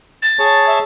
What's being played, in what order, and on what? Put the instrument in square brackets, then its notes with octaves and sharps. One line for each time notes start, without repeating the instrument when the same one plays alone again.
[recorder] A6
[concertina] G#4 C#5 A5
[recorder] E5